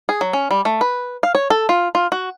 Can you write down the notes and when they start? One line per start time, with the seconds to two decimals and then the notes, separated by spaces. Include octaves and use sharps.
0.09 G#4
0.21 F#3
0.33 C#4
0.51 G3
0.65 A3
0.81 B4
1.23 F5
1.35 C#5
1.50 A4
1.69 F4
1.95 F4
2.12 F#4